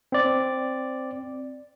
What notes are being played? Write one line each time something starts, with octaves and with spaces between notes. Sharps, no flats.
C4 D5